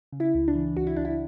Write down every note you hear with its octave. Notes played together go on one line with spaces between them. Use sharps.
C#3
E4
C#2
D4
E3
C#2 F#4
E4
C#2 D4
E4